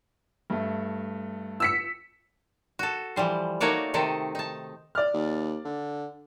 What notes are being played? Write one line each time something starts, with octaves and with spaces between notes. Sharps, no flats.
G2 A3
E6 B6 C#7
F#4 A4
E3 F3 G3 C5
A3 A#3 D#4 F#4 C#5 D5
C3 D#3 D#4 A4
D#4 A5
D5 F6
D#2
D3